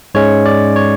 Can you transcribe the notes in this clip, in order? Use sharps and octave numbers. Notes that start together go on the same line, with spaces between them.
G#2 G#3 C#4 C#5
D5
C#5